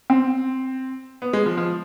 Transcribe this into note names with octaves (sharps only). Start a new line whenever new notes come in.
C4
B3
G#3
F3
F3